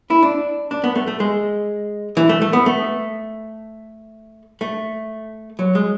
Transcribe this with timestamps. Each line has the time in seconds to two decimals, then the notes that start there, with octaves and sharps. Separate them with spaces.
0.10 E4
0.23 D4
0.71 D4
0.84 B3
0.96 A3
1.07 A3
1.20 G#3
2.17 E3
2.29 A3
2.42 A3
2.53 B3
2.66 A3
4.61 A3
5.59 F#3
5.75 G#3